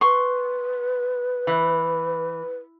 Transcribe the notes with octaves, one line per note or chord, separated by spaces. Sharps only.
B4 C6 C#6
E3